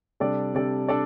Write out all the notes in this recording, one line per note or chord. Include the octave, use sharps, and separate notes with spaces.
C3 G3 D4 A4 D5
C3 G3 D4 A4 D5
D4 A4 D5